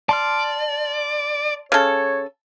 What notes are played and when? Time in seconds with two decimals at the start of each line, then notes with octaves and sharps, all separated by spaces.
0.09 D5 A5 C6 F6
1.72 C#3 A4 C#5